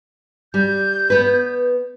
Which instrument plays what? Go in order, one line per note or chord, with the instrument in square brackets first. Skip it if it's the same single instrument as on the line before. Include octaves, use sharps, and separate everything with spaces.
[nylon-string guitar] G3 [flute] G6
[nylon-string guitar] B3 B4